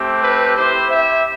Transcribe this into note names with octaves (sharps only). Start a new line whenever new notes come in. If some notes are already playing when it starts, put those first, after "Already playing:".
Already playing: A3 C4 G4
B4
C4 E4 G4 C5
E5